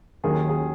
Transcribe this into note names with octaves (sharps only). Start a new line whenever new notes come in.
D#2 D#3 F#3 G#4
G#4